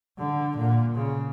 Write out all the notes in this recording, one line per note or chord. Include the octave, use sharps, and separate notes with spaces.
D3
A#2
C#3